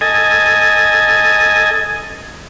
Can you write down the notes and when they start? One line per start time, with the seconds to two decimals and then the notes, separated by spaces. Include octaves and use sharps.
0.01 A4 D#5 G#5